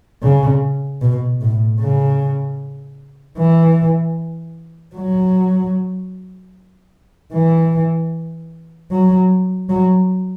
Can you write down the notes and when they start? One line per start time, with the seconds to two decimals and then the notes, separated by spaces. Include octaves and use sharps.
0.23 C#3
1.02 B2
1.41 A2
1.80 C#3
3.38 E3
4.96 F#3
7.33 E3
8.91 F#3
9.69 F#3